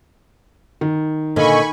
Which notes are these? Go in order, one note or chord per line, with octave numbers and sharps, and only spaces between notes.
D#3
A#2 D3 F4 D#5 G#5 B5 C#6